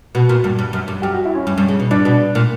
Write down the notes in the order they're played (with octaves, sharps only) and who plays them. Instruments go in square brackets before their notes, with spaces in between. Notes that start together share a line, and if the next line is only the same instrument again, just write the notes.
[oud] B2 [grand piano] F#4
[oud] A#2
G2
G2
F#2
G2
[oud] F#2 [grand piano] G4
[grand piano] F#4
E4
C#4
[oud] G2
G2
C#3
B2
[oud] G2 [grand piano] D4
[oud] B2
A#2